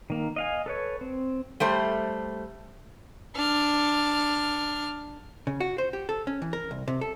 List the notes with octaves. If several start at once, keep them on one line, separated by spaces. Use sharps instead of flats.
D#3 A#3
D#5 F5 G#5
A4 B4 C#5
C4
G3 A3 C5
D4 F6
C#3
F#4
C5
G4
A4
C#4
E3
A#4
C2
C3
A4